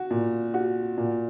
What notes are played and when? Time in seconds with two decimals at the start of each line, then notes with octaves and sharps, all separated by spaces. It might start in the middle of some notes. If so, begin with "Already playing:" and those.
Already playing: F#4
0.11 A#2
0.54 F#4
0.98 A#2